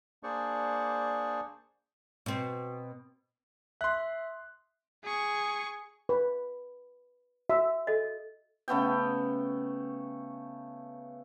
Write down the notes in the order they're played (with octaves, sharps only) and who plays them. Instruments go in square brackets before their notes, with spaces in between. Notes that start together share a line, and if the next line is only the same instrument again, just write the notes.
[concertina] A#3 D4 G#4 C5 D5 C#6
[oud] B2 C4
[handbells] E5 [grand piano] C6 F#6
[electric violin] G#4 C#6
[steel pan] B4
[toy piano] F#4 [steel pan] E5
[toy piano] A4 D#5
[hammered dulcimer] C#3 A3 B3 G5